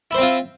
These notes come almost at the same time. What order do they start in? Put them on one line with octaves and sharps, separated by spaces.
E4 C5 C4 F4